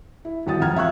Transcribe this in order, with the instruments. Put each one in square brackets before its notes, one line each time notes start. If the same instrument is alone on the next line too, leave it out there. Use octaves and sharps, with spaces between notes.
[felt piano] E4
D#1 E2 F#4 G5 D#6 A6
E1 F2 F#5 A#5 F6 G#6
E5 F5 C#6 E6 F#6